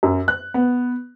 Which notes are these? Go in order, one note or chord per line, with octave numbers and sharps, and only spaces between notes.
F#2
F#6
B3